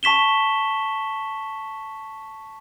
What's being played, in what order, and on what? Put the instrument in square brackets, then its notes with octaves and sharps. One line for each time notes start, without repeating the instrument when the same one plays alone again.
[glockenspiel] A5 C#6 B6 E7 G7